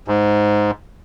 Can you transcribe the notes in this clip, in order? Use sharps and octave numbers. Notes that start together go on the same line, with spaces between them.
G#2